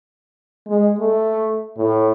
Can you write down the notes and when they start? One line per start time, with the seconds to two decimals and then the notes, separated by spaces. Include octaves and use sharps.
0.67 G#3
0.99 A3
1.77 A2